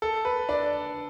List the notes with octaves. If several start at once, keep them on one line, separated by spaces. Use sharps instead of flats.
A4
B4
D4 D5